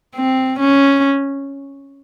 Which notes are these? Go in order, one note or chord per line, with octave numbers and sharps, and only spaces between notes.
C4
C#4